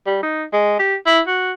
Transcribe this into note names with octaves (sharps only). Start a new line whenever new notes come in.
G3
D#4
G#3
G4
E4
F#4